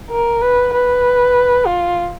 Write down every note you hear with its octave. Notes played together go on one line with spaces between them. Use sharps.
A#4
B4
B4
F4